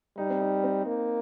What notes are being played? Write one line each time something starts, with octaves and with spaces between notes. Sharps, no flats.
G3 D#4
C4
D#4
C4
A#3 D#4